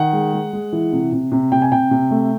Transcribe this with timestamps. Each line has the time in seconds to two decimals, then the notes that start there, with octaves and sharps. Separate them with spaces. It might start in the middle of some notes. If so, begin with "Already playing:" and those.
Already playing: D#3 F#5
0.13 G#3
0.33 G#3
0.53 G#3
0.73 E3
0.93 C3
1.12 C3
1.32 C3
1.52 C3 G5
1.62 G#5
1.72 C3 G5
1.91 C3
2.11 A3